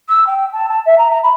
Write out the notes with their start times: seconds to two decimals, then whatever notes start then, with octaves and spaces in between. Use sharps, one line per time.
0.08 E6
0.27 G5
0.52 A5
0.68 A5
0.85 E5
0.98 A#5
1.10 A#5
1.23 B5